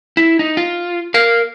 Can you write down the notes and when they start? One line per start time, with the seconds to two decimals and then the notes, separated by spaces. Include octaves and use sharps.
0.17 E4
0.39 D#4
0.57 F4
1.14 A#4 F5